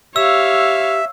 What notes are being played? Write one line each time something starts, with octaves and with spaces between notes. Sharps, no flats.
G4 C#5 E5 F5 E6